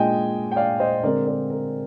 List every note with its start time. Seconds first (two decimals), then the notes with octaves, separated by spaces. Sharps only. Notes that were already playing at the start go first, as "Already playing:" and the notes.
Already playing: A#2 G#3 D4 F4 D#5 G5 G#5
0.52 G5
0.56 D5 F5
0.80 C5 D#5
1.03 D3 G#3 C4 A#4 D5
1.26 A#4 D5
1.50 A#4